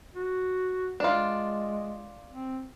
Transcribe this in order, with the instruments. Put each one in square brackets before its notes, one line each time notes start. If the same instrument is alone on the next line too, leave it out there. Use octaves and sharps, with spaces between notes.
[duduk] F#4
[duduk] G#3 [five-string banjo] D4 F4
[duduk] C4